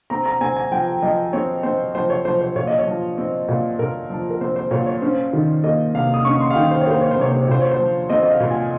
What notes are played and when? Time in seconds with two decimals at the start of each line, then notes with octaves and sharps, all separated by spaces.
0.10 C4 A#5
0.26 A#5
0.41 C4 G#5
0.57 G#5
0.72 F3 G5
1.02 F3 D#5
1.33 C4 C#5
1.63 C4 C5
1.95 F3 C5
2.10 C#5
2.25 F3 C5
2.41 C5
2.56 A#2 C#5
2.67 D#5
2.79 C#5
2.87 F3
3.18 C4
3.49 A#2
3.79 A#2 A#4
4.10 F3
4.30 A#4
4.40 C4 C5
4.56 C5
4.71 A#2 C#5
4.86 C#5
5.02 C#4 C5
5.33 D#3
5.64 A#3 D#5
5.95 C3 F5
6.14 D#6
6.25 C#4 C#6
6.40 C6
6.50 F5
6.56 D#3 G5
6.71 C5
6.81 C#5
6.87 A#3 C5
7.01 C#5
7.11 C5
7.18 C3 C#5
7.32 C5
7.42 C#5
7.48 A#2 C5
7.61 C#5
7.71 C5
7.79 F3
8.10 C4 D#5
8.23 D#5
8.30 F5
8.40 A#2
8.50 G#5